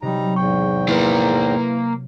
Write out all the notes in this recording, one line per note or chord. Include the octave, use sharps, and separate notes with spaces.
C3 F#3 G3 D#4 A#5
E2 G#2 G5 C#6
A#3 E4 B4 C5